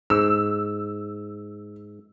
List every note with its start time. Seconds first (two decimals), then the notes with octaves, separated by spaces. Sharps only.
0.10 G#2 E6